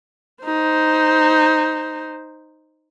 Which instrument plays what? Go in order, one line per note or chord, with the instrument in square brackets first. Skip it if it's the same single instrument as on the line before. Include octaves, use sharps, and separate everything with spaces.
[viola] D#4 C5